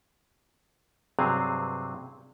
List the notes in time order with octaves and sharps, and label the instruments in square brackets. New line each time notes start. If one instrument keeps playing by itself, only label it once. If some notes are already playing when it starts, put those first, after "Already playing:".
[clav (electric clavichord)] G2 C3 F#3 C4 G#4 F5